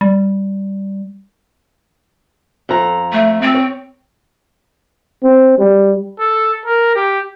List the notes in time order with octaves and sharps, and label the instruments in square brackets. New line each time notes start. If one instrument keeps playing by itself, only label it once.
[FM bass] G3
[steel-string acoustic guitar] F2 A#5
[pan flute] A3
C4
[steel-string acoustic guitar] C#5
[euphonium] C4
G3
[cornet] A4
A#4
G4